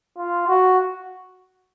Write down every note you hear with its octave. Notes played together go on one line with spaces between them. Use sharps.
F4
F#4